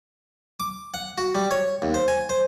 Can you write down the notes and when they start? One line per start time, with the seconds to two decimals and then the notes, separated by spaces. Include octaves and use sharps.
0.60 D6
0.94 F#5
1.18 F#4
1.35 G3
1.51 C#5
1.82 D#2
1.94 C5
2.08 G#5
2.29 C5